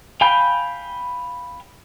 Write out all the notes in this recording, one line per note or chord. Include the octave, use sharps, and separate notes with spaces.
F5 G5 G#5 B5 G6